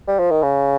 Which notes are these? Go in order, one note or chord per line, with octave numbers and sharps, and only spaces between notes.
G3
F3
D#3
C#3